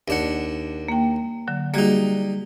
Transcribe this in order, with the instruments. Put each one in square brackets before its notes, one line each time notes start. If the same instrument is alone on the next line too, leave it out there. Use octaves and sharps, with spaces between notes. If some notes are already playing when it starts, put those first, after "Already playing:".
[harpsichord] D#2 D4 F#5
[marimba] A#3 G5
D3 F#3
[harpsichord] G3 D#4 [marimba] A#3 F#4 G#4